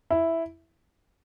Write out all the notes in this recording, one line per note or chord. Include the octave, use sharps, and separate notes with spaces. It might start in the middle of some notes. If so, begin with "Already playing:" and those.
E4